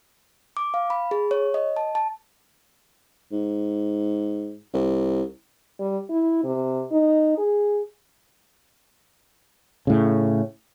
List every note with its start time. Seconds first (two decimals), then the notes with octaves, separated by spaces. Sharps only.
0.57 D6
0.74 F5
0.90 B5
1.11 G#4
1.31 C#5
1.54 D#5
1.77 A5
1.95 A5
3.32 G#2
4.74 C2
5.80 G3
6.10 E4
6.44 C3
6.91 D#4
7.38 G#4
9.87 A2 C#3